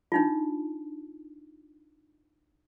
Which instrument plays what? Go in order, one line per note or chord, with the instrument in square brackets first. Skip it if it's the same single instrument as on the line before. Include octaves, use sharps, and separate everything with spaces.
[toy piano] D4 D#4 F4